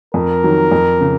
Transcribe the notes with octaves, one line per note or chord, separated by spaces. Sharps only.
F2 A#4
D#3 F#3
F2
C#3